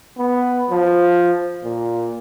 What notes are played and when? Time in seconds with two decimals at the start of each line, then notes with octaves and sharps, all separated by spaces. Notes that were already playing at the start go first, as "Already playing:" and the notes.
0.18 B3
0.70 F3
1.63 A#2